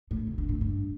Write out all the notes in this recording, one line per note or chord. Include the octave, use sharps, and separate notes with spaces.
A2
C3
D3
A2
G2